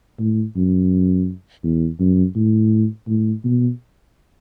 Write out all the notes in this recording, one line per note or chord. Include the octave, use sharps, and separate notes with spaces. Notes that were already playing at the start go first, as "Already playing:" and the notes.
A2
F#2
E2
F#2
A2
A2
B2